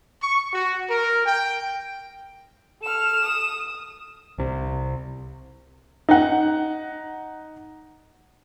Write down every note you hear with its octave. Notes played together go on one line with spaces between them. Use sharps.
C#6
F#4
A#4
G5
A4 F6 E7
D#6
C2 C3
D#4 F#5